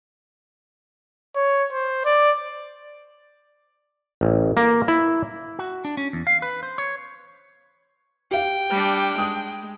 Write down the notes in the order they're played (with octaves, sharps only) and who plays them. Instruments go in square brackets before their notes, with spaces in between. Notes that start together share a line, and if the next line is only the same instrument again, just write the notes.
[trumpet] C#5
C5
D5
[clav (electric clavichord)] A1
A#3
E4
[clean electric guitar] F#4
D4
C#4
E2
F5
B4
C5
C#5
[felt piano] G4 F5 [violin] G5
[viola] G3 D4
[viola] G#3 [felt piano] D#6